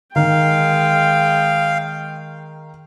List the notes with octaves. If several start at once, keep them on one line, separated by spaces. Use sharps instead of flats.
D#3 G#3 F5 G5